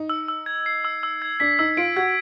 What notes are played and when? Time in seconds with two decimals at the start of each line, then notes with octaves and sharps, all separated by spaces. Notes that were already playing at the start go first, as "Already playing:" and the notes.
Already playing: D#4
0.09 E6
0.28 E6
0.46 G#6
0.66 C7
0.85 E6
1.03 E6
1.22 G#6
1.40 D4 B6
1.59 D#4 E6
1.77 F4 D7
1.96 F#4 G#6